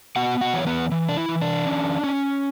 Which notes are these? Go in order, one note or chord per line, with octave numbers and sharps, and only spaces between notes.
B3 F#4 F#5
F#4 F#5
E3 C#5
B3 B4
E3
D4
E4
E3
D4
C#4
C#4